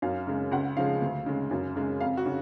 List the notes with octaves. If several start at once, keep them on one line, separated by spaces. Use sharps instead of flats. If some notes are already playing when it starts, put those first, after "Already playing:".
F#2 F5
C#3 G#3
C#2 F#5
C#3 F3 G#3 F5
D2
C#3 G#3
F#2
C#3 G#3
F2 F5
F#4
C#3